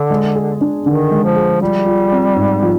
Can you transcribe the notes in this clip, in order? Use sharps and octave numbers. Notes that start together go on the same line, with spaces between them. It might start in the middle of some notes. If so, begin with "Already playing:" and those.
Already playing: D3
G#3
G#4
D4
D3 D#3
G#3
F3
G#4
F3 G3
F4
C4
G#2
F3